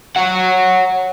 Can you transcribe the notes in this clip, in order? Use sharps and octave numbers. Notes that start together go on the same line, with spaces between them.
C#5 F#5